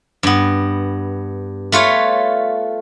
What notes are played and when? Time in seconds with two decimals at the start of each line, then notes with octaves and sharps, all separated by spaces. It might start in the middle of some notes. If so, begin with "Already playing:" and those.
0.23 G2 B3
1.72 A3 F4 B4 C#5